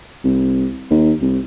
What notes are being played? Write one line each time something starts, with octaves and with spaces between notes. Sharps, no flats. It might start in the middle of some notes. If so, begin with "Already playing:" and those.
C2
D#2
C2